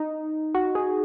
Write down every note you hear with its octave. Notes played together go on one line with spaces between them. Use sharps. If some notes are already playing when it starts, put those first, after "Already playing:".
Already playing: D#4
F#4
G#4